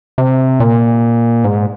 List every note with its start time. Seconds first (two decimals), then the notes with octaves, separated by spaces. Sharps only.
0.18 C3
0.60 A#2
1.44 G#2